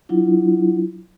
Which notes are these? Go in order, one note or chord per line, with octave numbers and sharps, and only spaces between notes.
F#3 D4 E4 F4